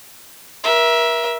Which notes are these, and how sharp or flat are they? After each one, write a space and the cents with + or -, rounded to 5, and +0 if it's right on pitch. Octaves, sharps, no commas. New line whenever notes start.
A#4 +35 E5 +0